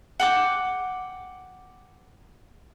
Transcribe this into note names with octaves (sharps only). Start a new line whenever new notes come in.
F#5 G5 D6